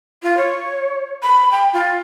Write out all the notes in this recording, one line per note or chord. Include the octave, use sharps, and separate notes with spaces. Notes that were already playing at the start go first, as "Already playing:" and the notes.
F4
C#5
B5
G5
F4